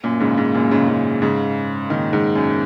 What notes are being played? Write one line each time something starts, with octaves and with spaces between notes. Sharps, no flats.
F#2 A#2
G#2 C#3
G#2
F#2 A#2
G#2 C#3
G#2 C#3
G#2 C#3
A#2 D#3
G#2
F#2